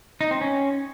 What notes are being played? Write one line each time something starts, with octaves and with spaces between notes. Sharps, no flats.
D#4
C4
C#4